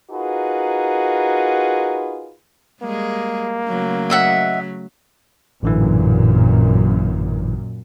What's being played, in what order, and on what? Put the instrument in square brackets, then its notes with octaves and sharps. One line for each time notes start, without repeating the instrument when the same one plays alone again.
[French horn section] D#4 F4 F#4 G#4 A#4 B4
[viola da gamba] G3 G#3 G#4 [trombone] A#3
[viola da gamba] C#3 F#3 A3
[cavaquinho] D#5 E5 F#5
[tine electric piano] A1 D3 E3 [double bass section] F#2 A#2